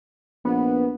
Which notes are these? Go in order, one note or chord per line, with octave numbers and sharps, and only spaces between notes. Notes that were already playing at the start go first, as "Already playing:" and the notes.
A#1 B3